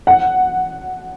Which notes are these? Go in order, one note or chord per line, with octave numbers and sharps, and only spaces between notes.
F#5